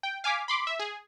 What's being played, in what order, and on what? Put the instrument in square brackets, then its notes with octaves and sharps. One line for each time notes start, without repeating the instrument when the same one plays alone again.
[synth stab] G5
F5 G#5 D6 B6
B5 C6 D6
E5
G#4